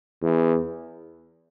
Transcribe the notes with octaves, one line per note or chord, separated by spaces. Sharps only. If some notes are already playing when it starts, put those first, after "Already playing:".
E2